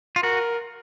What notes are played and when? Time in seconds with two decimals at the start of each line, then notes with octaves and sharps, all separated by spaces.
0.16 F4
0.23 F#4 A#4